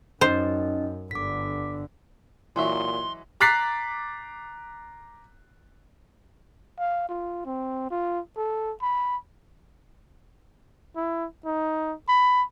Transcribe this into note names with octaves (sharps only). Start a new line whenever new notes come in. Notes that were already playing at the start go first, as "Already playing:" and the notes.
F#2 C#4 D#4 C5 D#5
G1 D3 D6 B6
A#2 E3 F#3 G#3 F#4 E5 C6
A#5 D6 F#6 A6 B6 C7
F5
F4
C4
F4
A4
B5
E4
D#4
B5